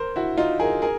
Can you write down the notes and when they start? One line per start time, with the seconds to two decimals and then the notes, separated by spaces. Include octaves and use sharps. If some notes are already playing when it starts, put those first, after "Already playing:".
Already playing: A#4 C5
0.16 E4 F#4
0.37 D#4 F4
0.60 G#4 A#4
0.82 G#4 A#4